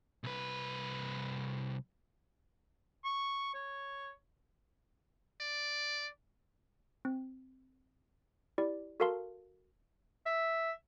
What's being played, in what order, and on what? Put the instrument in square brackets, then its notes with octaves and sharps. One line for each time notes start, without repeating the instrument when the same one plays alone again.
[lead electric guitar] C2 B4
[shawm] C#6
C#5
[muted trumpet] D5
[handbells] C4
E4 G4 D5
F#4 A4 A#4 F5 A5 C6
[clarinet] E5